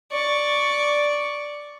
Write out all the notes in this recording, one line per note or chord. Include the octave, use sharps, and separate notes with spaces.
D5 C#6